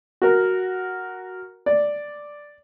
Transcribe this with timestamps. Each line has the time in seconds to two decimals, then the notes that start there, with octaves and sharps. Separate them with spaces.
0.22 F#4 A#4
1.66 D5